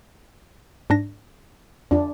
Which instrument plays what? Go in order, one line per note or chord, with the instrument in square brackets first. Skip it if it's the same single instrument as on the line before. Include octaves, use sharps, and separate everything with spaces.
[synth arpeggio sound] G#2 D4 A#6
[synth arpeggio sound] F2 F4 [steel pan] D4